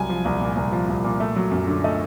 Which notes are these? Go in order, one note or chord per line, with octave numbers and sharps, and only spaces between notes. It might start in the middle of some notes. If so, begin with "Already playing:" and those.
Already playing: C2 F#3 G#5
F3
C2
A#2
C2
F3
C2
A#2
A3
F#3
F#2
D3
A3 D#5